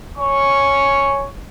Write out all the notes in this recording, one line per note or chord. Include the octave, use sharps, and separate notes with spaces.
C#5 G#5 C#6